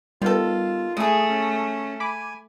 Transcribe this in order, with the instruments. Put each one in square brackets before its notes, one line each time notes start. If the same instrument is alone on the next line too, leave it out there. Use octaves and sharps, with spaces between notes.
[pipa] D#3 A4 [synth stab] G3 B3 [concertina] F4
[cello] A3 [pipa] E4 G#4 [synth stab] D#6
[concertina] C#4
[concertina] G#5 [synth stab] B5 D6